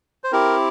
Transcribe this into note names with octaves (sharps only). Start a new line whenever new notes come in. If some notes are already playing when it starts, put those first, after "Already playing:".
C5
C4 E4 G4 A#4